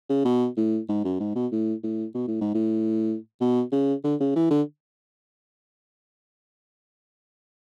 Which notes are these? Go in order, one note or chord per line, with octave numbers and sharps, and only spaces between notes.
C#3
B2
A2
G#2
F#2
G#2
B2
A2
A2
B2
A2
G#2
A2
B2
C#3
D3
C#3
E3
D3